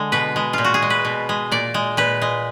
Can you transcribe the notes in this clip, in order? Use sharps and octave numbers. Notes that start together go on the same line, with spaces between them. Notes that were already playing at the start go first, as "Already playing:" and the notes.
Already playing: D3 G#3
B2 B4
G#3
A#2 F4
F#4
G#4
G#3
B4
B2
G#3
A#2 D5
G#3
A#2 B4
G#3